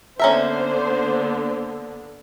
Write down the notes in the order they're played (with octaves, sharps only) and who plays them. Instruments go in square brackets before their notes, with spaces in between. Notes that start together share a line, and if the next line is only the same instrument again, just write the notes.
[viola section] D3 A#3 B3 [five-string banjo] C#4 A#4 E5 [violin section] C5